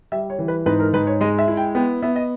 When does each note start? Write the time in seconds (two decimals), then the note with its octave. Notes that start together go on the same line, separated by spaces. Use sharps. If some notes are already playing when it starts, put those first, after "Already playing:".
0.12 G3 E5
0.30 C#5
0.39 E3
0.48 B4
0.66 G#2 B4
0.80 A#4
0.93 G#2 B4
1.07 C#5
1.21 G#3 D#5
1.39 E5
1.48 E4
1.57 G5
1.75 B3 G5
2.02 B3 E5
2.16 D#5